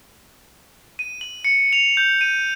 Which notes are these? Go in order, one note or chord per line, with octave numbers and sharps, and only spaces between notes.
D#7
F#7
C#7
F7
G6
D#7